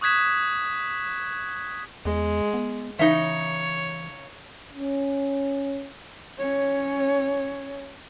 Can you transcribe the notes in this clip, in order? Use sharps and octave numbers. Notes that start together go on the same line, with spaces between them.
C#6 D#6 F#6 G#6 B6 E7
E2 G#3
B3
C#3 E3 D#4 C#5 E5
C#4
C#4 C#5